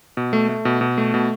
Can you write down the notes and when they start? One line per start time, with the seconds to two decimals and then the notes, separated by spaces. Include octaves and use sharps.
0.17 B2
0.33 A3
0.49 A3
0.65 B2
0.81 B2
0.98 A3
1.14 B2